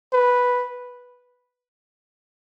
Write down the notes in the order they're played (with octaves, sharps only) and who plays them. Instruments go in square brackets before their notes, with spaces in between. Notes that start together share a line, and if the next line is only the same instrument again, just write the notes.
[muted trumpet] B4